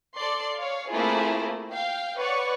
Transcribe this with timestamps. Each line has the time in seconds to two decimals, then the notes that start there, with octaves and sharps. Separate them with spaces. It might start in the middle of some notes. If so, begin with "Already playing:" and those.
0.16 A4 D5 C6
0.57 C#5 F5
0.90 A3 A#3 C4 E4 F4 G#4
1.71 F5 G5
2.18 B4 C#5 D5 F#5 C#6